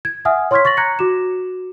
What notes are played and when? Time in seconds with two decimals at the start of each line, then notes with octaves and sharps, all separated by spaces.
0.05 G#6
0.25 E5 F#5 G#5 D#6 F6
0.51 C#5 C6 C#6 F6 G#6 B6
0.65 C#6 A6 A#6 F#7
0.77 A#5 F#6 G#6 A#6 C#7
0.99 F#4 D6 E7